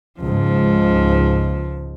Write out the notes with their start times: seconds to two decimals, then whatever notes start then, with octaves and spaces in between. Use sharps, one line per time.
0.20 C#2 G#2 F3